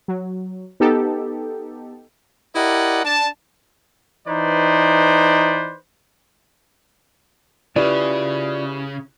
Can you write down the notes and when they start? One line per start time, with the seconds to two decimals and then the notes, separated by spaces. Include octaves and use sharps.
0.08 F#3
0.80 B3 D#4 G4 A4
2.55 E4 G4 A#4 D5 D#5 F#5
3.05 D4 A5
4.28 E3 D#4 B4 C5 D5
7.76 C#3 E4 F4 G4 B4 D5